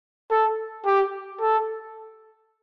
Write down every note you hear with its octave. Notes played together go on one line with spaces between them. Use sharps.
A4
G4
A4